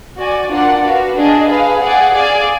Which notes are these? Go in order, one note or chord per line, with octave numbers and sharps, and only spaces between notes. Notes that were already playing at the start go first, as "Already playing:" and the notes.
F#4 D5 G#5
D4 F4 A#4 D5 F#5
F#4 B4 F5
D4 G#4 D#5
G#4 B4 F5
G#4 D5 F#5
G#4 D5 F5 G#5